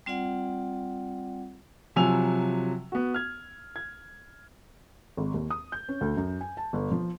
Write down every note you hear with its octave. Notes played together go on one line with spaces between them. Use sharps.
G3 C4 F4 D5 F#5
C3 F3 F#3 G#5 E6 F7
B3 F#4
F6 G#6
G#6
G#1
D#2
D#6
G6
C#4
D2
F#2
G#5
A5
G1
F3